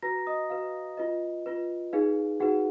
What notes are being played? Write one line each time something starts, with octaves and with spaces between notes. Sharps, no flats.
F#4 B4 A#5 A#6
D#5 D#6
F#4 B4 F5
F4 B4 D#5
F4 B4
D#4 G#4 B4 F5
D#4 F#4 G#4 B4 F#5